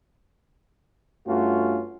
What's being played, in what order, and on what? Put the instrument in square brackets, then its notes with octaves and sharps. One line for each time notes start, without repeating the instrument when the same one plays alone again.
[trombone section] G2 A3 C#4 F4 F#4